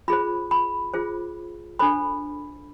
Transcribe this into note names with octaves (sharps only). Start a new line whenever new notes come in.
F4 G#4 C5 B5
B5
F4 G#4 C5
D4 A4 C5 B5